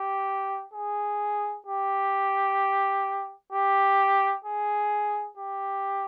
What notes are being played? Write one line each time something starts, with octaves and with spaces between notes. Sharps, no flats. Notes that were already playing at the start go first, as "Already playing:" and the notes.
Already playing: G4
G#4
G4
G4
G#4
G4